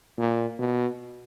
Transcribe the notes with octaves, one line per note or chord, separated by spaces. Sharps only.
A#2
B2